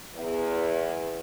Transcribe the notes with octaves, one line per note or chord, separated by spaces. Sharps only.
E2